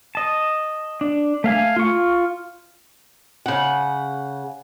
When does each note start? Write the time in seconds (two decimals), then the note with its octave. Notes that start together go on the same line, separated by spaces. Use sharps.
0.15 D#5 A5
1.01 D4
1.44 A3 F5 G#5
1.76 F4 C#6
3.46 C#3 F#5